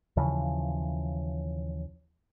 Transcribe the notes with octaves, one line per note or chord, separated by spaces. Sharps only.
D#2 C#3 E3 F3